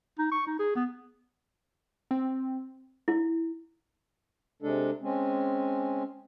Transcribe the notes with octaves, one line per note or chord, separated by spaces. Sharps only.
D#4
C#6
D#4
G#4
B3
C4
E4
C3 G#3 D4 A4
G#3 C4 C#4